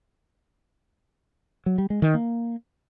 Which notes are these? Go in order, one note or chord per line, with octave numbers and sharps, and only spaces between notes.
F#3
G3
G#3
D#3
A#3